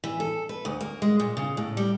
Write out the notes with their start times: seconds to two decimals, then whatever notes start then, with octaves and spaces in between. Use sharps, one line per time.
0.04 E3
0.20 A4
0.49 B4
0.65 D2
0.81 A#3
1.02 G#3
1.20 A#2
1.37 C#3
1.57 A2
1.77 G3